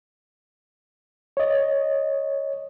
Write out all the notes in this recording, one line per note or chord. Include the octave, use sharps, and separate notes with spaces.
C#5 D#5